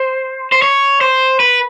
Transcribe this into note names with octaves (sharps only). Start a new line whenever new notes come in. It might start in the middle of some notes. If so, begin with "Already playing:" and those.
Already playing: C5
C5
C#5
C5
B4